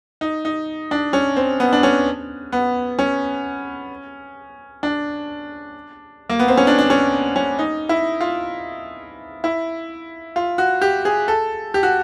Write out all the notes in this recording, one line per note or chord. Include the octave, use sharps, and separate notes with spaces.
D#4
D#4
D4
C#4
C4
B3
D4
C#4
B3
C#4
D4
A#3
B3
C4
C#4
D4
D4
C#4
C#4
D#4
E4
F4
E4
F4
F#4
G4
G#4
A4
G4
F#4